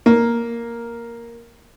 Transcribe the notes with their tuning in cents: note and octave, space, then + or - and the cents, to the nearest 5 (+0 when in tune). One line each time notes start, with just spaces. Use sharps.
A#3 +5